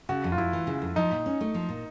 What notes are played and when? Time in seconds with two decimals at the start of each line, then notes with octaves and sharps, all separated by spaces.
0.09 C#3 F#4
0.24 F2
0.32 F4
0.38 F2 E4
0.53 E3
0.67 C#3
0.82 F2
0.96 F3 D#4
1.11 A#2
1.26 C#4
1.41 A3
1.55 F3
1.69 A#2